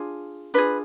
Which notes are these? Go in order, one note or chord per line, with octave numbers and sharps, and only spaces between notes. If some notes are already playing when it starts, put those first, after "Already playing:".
Already playing: D4 F4 G#4
D4 F4 G#4 B4